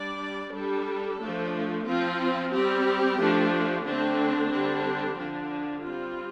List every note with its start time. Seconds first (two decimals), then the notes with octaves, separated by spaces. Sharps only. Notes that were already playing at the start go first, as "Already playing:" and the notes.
Already playing: G3 D4 D5
0.52 G3 D4 A4
1.19 F3 A3 D4
1.85 F3 C4 F4
2.51 G3 C4 G4
3.18 F3 A3 D4
3.84 D3 A3 C4 D4
4.50 D3 G3 C4
5.17 D3 F3 D4
5.83 G3 C4 F4